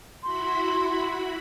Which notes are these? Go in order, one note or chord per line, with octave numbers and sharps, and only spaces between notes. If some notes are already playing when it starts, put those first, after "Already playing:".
E4 F#4 B5 C6